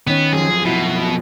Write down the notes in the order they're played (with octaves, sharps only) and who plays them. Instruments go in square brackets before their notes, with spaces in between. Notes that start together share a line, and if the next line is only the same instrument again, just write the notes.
[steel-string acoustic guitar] D#3 C#4 [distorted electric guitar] B3
[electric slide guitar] F#2 F3 [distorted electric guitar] G#4
[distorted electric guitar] B2 [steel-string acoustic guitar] E4 F#4